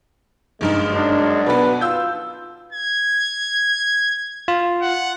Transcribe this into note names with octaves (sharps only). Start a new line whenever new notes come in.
F#1 G2 G#3 D#4
F#2 F#3 D4
B2 B3 B4
F4 E6 G6
G#6
F4
F#5